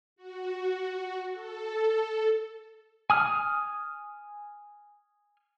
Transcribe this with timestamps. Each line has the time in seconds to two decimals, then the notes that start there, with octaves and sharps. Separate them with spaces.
0.16 F#4
1.32 A4
3.10 G#5 D#6 F6